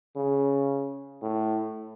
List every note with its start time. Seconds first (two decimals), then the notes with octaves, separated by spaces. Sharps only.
0.17 C#3
1.22 A2